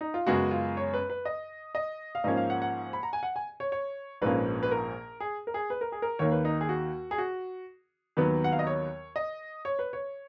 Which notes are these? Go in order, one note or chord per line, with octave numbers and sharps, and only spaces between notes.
D#4
F4
F#2 C#3 G#3 B3 F#4
F4
C#5
B4
B4
D#5
D#5
F5
G#2 F3 A#3 C#4 D#5
F5
F#5
F#5
B5
A#5
G#5
F#5
G#5
C#5
C#5
A#1 G#2 F3 A#3 C#4 B4
B4
A#4
G#4
A#4
G#4
B4
A#4
G#4
A#4
D#2 D#3 A#3 C#5
B4
D#4
G#4
F#4
G#4
F#4
D#2 D#3 F#3 B3 B4
F#5
F5
D#5
C#5
D#5
C#5
B4
C#5